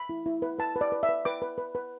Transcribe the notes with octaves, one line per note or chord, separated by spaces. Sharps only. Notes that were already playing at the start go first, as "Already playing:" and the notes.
Already playing: B5
E4
E4
B4
B4 A5
B4
D5
B4
E5
B4
B4 D6
B4
B4
B4